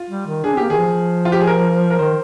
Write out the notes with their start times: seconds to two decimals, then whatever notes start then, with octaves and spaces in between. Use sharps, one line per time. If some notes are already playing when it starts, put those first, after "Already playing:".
Already playing: F4
0.10 G3
0.27 D#3
0.44 D4 G#4
0.54 C4
0.57 A#3 G4
0.70 D#3 G#4
0.78 F3
1.25 F4
1.32 G4
1.40 G#4
1.47 A#4
1.90 A#4
1.99 D#3 C5